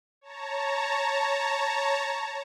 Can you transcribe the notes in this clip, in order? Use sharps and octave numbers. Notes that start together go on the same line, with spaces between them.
C#5 A5 A#5